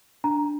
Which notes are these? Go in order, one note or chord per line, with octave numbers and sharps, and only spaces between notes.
D4 A#5